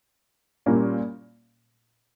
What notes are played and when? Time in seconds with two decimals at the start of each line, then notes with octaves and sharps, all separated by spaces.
0.66 A#2 G3 A#3 C#4